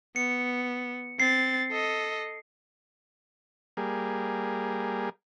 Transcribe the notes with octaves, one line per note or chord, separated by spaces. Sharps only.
B3 C#7
C4 A6 C7
A4 D#5
G3 A#3 G#4